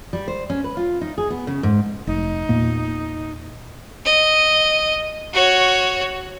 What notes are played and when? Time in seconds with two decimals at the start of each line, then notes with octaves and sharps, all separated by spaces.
0.13 G3
0.28 C5
0.50 C#4
0.64 B4
0.77 F4
1.01 D#4
1.18 G#4
1.30 B3
1.47 C#3
1.63 G#2
2.07 F1 D#4
2.49 E2 A#2 A#3
4.05 D#5
5.33 F#4 C#5